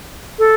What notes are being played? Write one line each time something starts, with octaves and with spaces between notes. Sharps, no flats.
A4